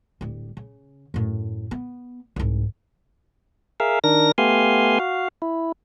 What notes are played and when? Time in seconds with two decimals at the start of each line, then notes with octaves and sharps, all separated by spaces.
0.21 D1 G3
0.57 C#3
1.14 F#2 A2
1.71 B3
2.36 C2 G#2
3.80 G#4 A#4 E5 F5
4.04 D#3 D4 A#4 A#6
4.38 A3 B3 G4 F5 G#5 C6
4.99 F#4 F5
5.42 E4